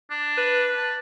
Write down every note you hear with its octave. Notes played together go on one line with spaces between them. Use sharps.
D4
B4
A5